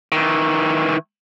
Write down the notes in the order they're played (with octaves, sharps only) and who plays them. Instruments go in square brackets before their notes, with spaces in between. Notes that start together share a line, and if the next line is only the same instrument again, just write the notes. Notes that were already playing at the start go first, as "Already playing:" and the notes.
[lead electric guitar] D#3 E3